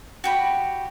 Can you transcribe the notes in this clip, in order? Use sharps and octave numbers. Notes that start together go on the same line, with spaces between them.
F#4 G4 B5